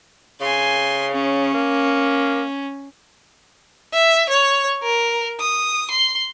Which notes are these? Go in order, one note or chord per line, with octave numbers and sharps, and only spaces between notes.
C#3 G#5 C6
C#4
A#3
E5
C#5
A#4
D#6
C6